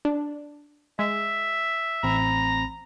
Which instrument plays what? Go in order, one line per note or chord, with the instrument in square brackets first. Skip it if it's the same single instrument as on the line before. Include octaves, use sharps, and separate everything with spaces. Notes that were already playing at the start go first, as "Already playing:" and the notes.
[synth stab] D4
[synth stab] G#3 [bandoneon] E5
[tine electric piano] A1 C4 B5 [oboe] A#5